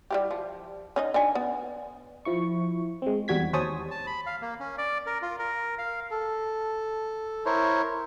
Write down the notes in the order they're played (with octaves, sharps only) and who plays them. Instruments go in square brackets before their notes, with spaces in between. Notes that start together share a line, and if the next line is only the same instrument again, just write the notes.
[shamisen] G3 E4 G4
F3
C#4 D#4 D#5
D4 D#4 G#5
B3
[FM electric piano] F3 E4 C#6
G#3 C4
E2 G3 F#4 G#6 B6
D#2 C5 C#5 G#5 A5 D#6
[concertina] A5
B5
F5
A#3
C#4
D5
A#4
F4
A#4
F5
[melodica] A4
E4 A#4 C5 C#5